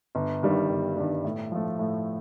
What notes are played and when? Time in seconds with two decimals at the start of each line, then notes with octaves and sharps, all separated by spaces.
0.15 G1
0.43 G2 D#3 G3
0.69 G1
0.97 G2 D#3 G3
1.25 A2
1.52 F3 A3
1.79 A2